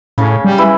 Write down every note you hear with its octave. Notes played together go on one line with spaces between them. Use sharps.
A2 C#3 C#4
G3
E3 E4